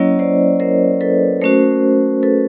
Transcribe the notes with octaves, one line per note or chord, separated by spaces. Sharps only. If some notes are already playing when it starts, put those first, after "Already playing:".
Already playing: F#3 A#3 C#4 E4 C#5 D#5
C5 D5
A#4 C5
A4 B4
A3 C#4 F#4 A#4 C5
A4 B4